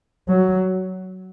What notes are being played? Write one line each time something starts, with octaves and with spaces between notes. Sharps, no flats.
F#3